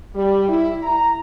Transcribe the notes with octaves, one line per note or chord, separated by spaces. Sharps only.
G3
E4
A#5